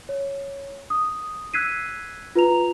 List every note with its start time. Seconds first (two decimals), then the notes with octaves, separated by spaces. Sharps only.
0.09 C#5
0.90 D#6
1.54 E6 F#6 G#6 B6 C7 D#7
2.35 F4 B4 A#5 F7